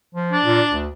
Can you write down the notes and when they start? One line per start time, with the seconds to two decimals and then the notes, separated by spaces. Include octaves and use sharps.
0.14 F3
0.32 D4
0.44 A#2
0.71 D2